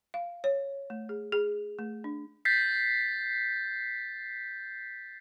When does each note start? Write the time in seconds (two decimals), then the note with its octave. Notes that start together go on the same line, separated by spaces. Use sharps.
0.14 F5
0.44 C#5
0.90 A3
1.09 G#4
1.32 G#4
1.79 A3
2.04 D4
2.45 G6 A6 B6 C7